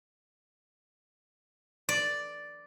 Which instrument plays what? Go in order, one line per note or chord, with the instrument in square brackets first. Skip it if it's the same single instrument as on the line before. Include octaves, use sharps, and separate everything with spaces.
[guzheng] D5